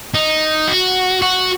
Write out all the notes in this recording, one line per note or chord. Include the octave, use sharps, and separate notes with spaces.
D#4
F#4
F#4